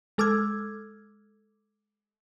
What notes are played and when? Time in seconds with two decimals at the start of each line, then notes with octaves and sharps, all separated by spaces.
0.18 G#3 A4 D6 E6 F6 G#6